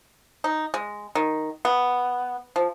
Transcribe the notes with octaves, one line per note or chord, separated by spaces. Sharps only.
D#4
G#3
D#3
B3
F3